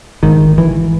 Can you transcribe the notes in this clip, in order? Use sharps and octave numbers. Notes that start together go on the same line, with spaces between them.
G#1 G#2 D#3
E3